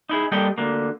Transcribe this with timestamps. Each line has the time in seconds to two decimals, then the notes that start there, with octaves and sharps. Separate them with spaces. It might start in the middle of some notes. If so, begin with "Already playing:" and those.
0.09 D#4 E4 G#4
0.32 G3 A#3 A4 D#5 G5
0.58 D2 D3 A#3